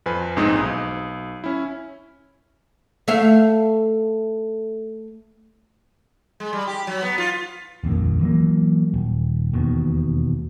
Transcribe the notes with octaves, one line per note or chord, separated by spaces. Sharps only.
F2 B4 C5 G#5
A#1 G#2 C4 D#4 G#4 D#6
B1 D#6
C#4 E4
A3 E5 F5
G#3
G3
G4
F#3
B3
F4
D#1 A#1 F2 A#2
E3 F#3 A#3
D#1
E1 D#2 B2